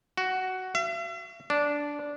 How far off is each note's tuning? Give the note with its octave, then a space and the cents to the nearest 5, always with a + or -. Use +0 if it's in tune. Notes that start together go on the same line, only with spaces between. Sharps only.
F#4 +10
E5 +45
D4 -10